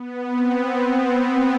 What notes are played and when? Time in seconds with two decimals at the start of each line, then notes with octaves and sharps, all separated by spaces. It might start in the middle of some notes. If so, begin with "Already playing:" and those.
Already playing: B3
0.29 C4